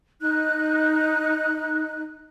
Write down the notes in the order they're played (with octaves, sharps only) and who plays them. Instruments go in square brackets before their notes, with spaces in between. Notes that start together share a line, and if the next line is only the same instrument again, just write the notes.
[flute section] D#4 F#6